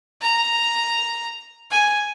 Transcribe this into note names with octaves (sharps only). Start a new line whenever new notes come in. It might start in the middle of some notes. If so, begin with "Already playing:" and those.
A#5
G#5